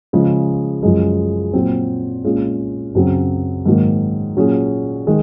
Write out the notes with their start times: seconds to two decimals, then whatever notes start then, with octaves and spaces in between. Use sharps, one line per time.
0.13 C#3 F3 G#3
0.83 F#2 F3 G#3
1.53 A#2 F#3 C4
2.24 A#2 G#3 C#4 F4 G#4
2.95 F#2 C#3 F#3 C4
3.65 G#2 D#3 F#3 A#3
4.37 A#2 F#3 C#4 G#4
5.07 D#3 G#3